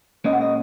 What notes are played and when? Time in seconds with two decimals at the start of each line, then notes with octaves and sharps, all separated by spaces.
0.24 A#2 G#3 C#4 D#5
0.33 F#5
0.41 D#5